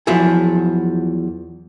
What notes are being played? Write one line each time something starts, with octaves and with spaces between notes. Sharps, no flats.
E2 F3 F#3 E4 G#4